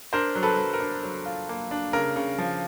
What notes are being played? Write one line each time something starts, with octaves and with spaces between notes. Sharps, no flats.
D4 A#4 C5
F#3
A4 B4
F#3
A#4
D4
F#3
F4
A#3
D4
C#3 A#4
C#3
F3